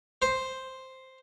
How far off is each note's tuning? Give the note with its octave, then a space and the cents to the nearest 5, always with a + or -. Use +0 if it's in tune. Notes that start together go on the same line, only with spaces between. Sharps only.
C5 +0